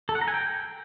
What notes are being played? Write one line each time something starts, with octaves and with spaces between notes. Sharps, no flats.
A4
F#5
A#5
G#5
G5